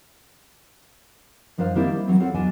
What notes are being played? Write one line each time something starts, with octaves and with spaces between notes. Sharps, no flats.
F#2 F3 D4 D#4 C5 F5
D#3 G3 A#3 C4 D4 E4
C5
E3 F#3 C4 E4
C4 F4 A4 C#5 F#5
E2 F#3 D4 D#5 G#5 A5